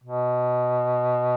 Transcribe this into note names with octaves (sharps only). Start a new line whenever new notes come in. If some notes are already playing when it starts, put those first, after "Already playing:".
B2